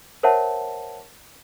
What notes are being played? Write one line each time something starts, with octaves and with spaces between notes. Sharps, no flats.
A#4 C5 C#5 E5 F#5 A5